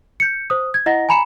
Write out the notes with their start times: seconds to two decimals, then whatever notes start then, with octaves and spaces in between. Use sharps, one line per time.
0.20 G6 C#7
0.50 C5 D#6
0.74 G#6
0.86 E4 D#5 F#5 A#5 A#6
1.09 G#5 A#5 B5 C#7 E7